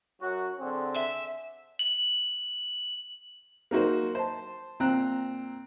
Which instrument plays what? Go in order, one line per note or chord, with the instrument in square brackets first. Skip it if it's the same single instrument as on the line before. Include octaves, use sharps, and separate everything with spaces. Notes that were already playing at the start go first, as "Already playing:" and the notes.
[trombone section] F#2 F#3 F#4
D3 C4 G#4
[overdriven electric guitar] E5
[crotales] F#7
[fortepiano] A#3 D#4 F#4 C5
C5 A5
A#2 C4 A#5 F#6